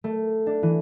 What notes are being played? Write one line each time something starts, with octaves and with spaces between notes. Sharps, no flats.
A3
D4
E3